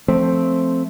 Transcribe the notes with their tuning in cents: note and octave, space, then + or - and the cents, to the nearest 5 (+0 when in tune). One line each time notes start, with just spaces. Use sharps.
F3 +0 A3 +0 C4 +0